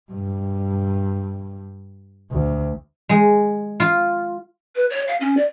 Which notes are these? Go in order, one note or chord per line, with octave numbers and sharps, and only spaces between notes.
G2
D2
G#3
F4
B4
C#5
F5
C#4
D5